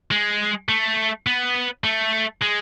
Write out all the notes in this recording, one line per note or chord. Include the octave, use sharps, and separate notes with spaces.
G#3
A3
B3
A3
G#3